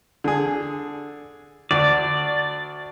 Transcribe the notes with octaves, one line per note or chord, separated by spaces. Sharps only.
D3 G#4
D2 D5